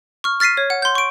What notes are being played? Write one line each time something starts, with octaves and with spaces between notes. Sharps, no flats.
C#6 F6
F6 A6 B6 C7 D#7
C#5
F#5
C6 G6
C#6 D7